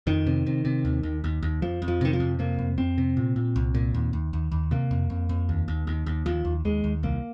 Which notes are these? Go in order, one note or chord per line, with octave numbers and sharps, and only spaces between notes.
F2 D#3
C3
C3
C3
D#2
D#2
D#2
D#2
F2 F3
F2
F3
C3 D#3
F3
F2
C3 A#3
F2
F2 C4
C3
A#2
A#2
C2
A#2
D#2
D#2
D#2
D#2
C3 A#3
F2
F2
F2
D#2
D#2
D#2
D#2
D#2 F3
D#2
D#2 G#3
D#2
C2 A#3